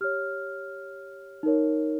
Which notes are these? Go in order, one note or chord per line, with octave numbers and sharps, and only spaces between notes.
G4 C#5 F6
D#4 A#4 C#5